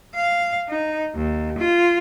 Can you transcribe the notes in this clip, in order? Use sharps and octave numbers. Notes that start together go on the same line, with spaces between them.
F5
D#4
D#2
F4